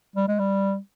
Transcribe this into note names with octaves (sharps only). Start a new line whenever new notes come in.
G3
G#3
G3